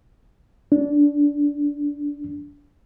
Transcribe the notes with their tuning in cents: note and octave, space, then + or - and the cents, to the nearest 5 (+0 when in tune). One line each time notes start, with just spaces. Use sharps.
D4 -20